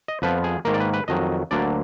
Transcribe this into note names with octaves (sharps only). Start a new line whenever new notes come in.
D#5
F2 F3 B3 B4
G#4
G#2 D#3 A#3 A#4
D5
B4
B4
F2 D#3 F#3 D#5
D2 D3 F#3 A#3 D5